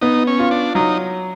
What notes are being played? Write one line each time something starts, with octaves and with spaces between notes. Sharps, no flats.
B3 D#4
C#4
F4
D4
F#3 D#4